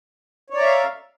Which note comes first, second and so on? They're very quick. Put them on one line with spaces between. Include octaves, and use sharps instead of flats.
C#5 D5 A#5 E5 F5